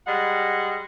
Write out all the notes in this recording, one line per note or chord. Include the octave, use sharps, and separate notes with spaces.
G3 G#3 F#5